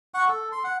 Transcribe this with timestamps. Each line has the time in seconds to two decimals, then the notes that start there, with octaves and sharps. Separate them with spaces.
0.14 F#5 C#6
0.28 A4
0.52 C6
0.64 F#5